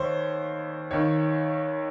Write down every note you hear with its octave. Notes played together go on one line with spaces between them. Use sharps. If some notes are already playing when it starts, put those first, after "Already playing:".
Already playing: D#2 C5 C#5
D#2 D#3 C#5